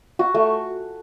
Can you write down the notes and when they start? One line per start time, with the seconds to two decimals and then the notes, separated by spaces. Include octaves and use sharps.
0.19 F#4
0.34 A3